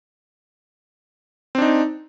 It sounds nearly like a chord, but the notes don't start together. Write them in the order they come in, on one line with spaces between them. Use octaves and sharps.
C4 D4 D#4